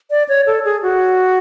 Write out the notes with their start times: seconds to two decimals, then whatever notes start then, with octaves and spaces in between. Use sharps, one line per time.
0.10 D5
0.29 C#5
0.47 A4
0.65 G#4
0.83 F#4